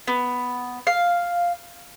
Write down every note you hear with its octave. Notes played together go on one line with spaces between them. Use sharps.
B3
F5